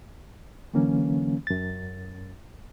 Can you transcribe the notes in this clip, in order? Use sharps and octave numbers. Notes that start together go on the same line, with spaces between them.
D3 E3 F#3 A#3 C#4
F#2 A6